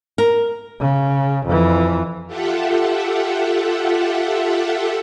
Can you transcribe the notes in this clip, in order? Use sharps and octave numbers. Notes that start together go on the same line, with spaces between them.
A#4
C#3
F2 E3
F4 G4 A4 E5 F#5